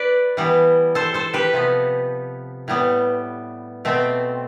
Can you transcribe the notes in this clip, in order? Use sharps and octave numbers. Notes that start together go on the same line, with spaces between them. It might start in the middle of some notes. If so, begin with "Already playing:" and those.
Already playing: B4 D5
E3 G3 B3
A4 C5
A4 C5
G4 B4
C3 F3 B3
A2 G3 B3
B2 A3 C4